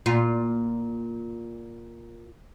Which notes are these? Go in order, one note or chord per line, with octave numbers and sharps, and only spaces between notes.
A#2 F4